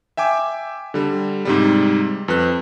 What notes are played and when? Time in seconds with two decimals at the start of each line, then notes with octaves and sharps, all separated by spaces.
0.17 E5 G5 G#5 D6
0.94 D3 G3
1.45 G#2 C3 G3
2.28 F2 B4 F#6